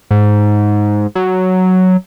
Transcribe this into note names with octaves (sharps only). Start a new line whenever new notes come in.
G#2
F#3